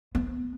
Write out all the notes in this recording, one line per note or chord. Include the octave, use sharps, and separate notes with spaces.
B3